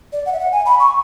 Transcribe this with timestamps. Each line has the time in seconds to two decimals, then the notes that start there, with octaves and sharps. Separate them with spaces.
0.12 D5
0.26 F#5
0.33 E5
0.39 F#5
0.52 G#5
0.66 B5
0.80 C#6